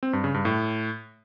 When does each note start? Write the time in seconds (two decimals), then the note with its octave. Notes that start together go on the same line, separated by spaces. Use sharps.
0.03 C4
0.13 G2
0.24 C#3
0.34 G2
0.45 A2